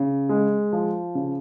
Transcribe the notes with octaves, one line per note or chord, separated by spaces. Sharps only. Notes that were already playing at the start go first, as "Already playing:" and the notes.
Already playing: C#3
G#3
F3
C#3